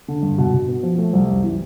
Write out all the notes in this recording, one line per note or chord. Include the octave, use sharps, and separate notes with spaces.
D3
G2
B2
B2
B3
F3
A3
C2
F#2
E3